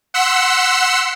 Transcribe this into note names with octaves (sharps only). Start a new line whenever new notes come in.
F#5 C6 E6 B6 C#7